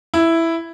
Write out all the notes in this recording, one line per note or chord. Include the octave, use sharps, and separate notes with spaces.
E4